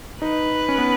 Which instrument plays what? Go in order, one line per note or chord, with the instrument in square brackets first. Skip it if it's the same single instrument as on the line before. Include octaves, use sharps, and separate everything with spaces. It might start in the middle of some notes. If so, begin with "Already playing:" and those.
[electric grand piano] D#4 [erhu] B4
[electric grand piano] C#4
B3